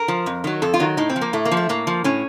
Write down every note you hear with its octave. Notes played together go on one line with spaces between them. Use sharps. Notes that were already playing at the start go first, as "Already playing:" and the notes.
Already playing: A#4
F3
F2
D#3 F#3
F2 A4
F4
D#3 F#3
A2 D#4
C4
F3
A#3
A2 A3
A#3
F3
A3
A2 A#3
F3
A2 C#4